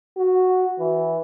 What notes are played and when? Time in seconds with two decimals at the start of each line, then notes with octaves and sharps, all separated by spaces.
0.17 F#4
0.79 E3